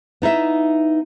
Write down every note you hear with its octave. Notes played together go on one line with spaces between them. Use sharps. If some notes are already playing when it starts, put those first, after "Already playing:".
B3 D#4 E4 E5